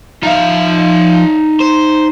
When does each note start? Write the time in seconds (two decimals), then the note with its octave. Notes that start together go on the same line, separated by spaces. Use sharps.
0.23 F3 D#4 E5 F5
1.61 C5